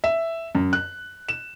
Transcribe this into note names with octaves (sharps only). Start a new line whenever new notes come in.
E5
F#2
F#6
E7